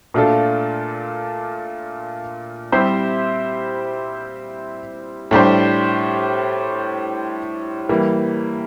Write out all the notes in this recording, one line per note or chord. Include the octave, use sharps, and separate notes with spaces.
A#2 A3 D4 F4 A4
G3 C4 E4 G4 C5
A2 G3 D4 G4 C5
E3 G3 A#3